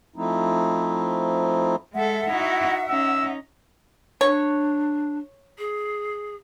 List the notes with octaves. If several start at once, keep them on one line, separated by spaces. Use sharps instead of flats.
F3 A3 C4 D#4 E4
G#3 A4 E5 F#5
D#4 E4 F#4
C#4 D#4 E6
D4 C#5
G#4